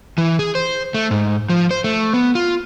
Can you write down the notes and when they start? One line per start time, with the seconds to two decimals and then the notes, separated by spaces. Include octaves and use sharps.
0.18 E3
0.39 G#4
0.55 C5
0.94 A3
1.11 G#2
1.49 F3
1.71 C5
1.84 A3
2.14 B3
2.35 F4